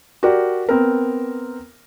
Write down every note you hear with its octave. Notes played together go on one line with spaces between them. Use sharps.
F#4 G4 A#4 D5
B3 C4 A#4